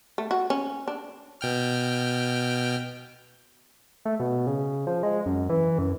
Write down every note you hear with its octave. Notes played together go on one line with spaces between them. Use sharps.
A3
F#4
C#4
D4
B2 G5 F6
A3
B2
C#3
F3
G#3
F#2
E3
F#2